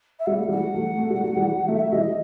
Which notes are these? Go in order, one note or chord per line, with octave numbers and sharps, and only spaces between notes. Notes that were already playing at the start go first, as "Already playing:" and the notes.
E5
G3 F#5
A3
E3 G3 F#5
F#3 A3
A3
G3
F#3
E3 G3
F#3 A3 E5
E3 G3 D#5